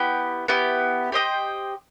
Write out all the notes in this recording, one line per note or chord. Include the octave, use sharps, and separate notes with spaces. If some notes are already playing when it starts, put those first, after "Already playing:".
Already playing: B3 E4 G4
B3 E4 G4
G4 C5 D#5 G5